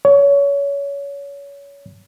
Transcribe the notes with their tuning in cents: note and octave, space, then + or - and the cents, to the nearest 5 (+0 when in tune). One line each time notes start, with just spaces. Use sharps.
C#5 +25